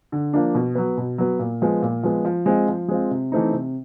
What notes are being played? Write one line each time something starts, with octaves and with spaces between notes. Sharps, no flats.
D3
F3 A#3 D4
B2
F#3 B3
B2
F#3 B3
A#2
F3 G#3 B3
A#2
F3 G#3 B3
F3
G#3 C4 F4
F3
G#3 C4 F4
C3
E3 A3 C4 D#4
C3